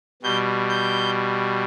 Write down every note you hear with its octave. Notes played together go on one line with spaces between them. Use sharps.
B2 G3 G6
G6